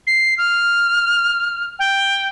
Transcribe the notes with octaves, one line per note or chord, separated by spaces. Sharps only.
C7
F6
G5